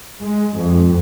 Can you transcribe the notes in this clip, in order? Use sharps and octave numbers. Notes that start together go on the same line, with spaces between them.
G#3
F2